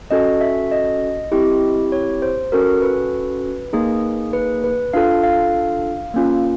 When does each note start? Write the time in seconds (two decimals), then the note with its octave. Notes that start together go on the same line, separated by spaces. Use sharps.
0.11 C#4 F#4 A4 D#5
0.41 E5
0.71 D#5
1.32 C4 E4 G4
1.92 C#5
2.22 C5
2.52 C#4 F#4 A4 A#4
2.82 B4
3.73 A#3 D#4 G#4
4.33 B4
4.64 B4
4.93 D4 F4 A4 F5
5.24 F5
6.14 A#3 C#4 F4